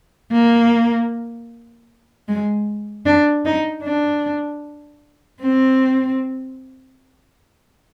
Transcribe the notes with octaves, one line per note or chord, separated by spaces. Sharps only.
A#3
G#3
D4
D#4
D4
C4